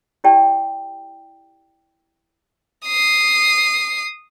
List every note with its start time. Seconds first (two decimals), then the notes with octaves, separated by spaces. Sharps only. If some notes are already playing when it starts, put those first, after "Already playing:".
0.24 E4 G4 D5 G5 A5
2.86 D#6 C7